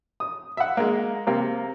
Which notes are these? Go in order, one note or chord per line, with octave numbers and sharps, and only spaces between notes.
D#6
E5 F#5
G#3 A#3
C3 A#3